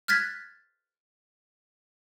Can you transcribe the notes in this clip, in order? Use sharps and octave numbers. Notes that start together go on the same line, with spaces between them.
F6 F#6 G#6 A6 B6